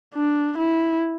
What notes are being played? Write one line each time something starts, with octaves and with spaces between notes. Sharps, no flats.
D4
E4